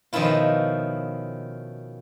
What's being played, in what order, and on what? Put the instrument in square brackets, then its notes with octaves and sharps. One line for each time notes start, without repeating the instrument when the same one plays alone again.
[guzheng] B2 D#3 F3 C#4 E4 F4